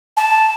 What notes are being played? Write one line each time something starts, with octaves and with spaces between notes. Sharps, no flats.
A5